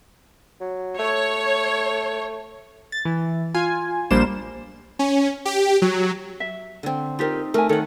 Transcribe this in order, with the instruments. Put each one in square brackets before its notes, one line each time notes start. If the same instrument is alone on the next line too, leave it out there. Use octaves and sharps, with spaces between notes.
[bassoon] F#3
[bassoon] A3 [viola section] C#5
[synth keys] A6
E3
F4 G#5
A#1 G3 A#3 D4 C5 E7
[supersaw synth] C#4
G4
F#3
[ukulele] E5
[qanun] D3 C4
[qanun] C4 D#4 [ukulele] F4 G4 A#4
[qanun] A3 [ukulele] A#4 G#5
[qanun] D#3 F#5 [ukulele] A4 A#4 C#5